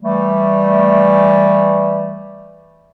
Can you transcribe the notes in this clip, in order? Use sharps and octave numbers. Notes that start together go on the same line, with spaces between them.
E3 G3 A3